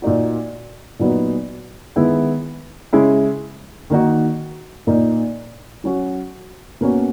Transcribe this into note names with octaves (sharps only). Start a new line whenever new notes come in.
A#2 A#3 D#4 F#4
A#2 F#3 B3 D#4
D#3 G#3 B3 E4
C#3 G#3 C#4 E4
D#3 A#3 D#4 F#4
A#2 A#3 D#4
F#3 C#4 F#4
B2 A#3 C#4 F#4